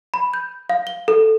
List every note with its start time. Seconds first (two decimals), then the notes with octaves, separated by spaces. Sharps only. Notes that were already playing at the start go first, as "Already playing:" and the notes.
0.14 B5
0.34 G6
0.70 F5
0.87 G7
1.08 A4